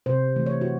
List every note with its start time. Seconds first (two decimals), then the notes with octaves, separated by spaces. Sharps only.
0.06 C3 C5
0.36 E3 A3
0.46 C#5
0.61 F#4